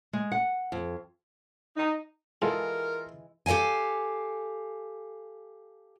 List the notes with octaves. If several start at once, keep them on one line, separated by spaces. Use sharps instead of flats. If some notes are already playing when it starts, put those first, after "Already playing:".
G#3
F#5
F2
D#4
G#2 E3 G#3 F4 A4 A#4
G4 A4 C#5 F5 G#5